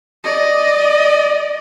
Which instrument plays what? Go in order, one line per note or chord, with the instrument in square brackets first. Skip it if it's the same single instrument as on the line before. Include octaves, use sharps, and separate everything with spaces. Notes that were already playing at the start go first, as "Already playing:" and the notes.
[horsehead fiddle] D5 D#5